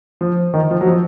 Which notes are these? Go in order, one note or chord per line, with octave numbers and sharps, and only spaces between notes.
F3
D#3
F3
F#3
F3